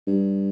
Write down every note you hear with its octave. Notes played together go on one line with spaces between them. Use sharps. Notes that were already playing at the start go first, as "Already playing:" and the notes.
G2